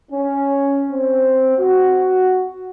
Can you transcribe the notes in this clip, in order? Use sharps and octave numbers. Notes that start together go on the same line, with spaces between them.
C#4
C4
F#4